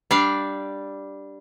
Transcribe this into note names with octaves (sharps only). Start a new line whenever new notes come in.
G3 D4 D5 F5